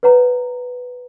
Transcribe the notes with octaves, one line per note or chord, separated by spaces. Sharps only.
B4 C#5 F#5 A#5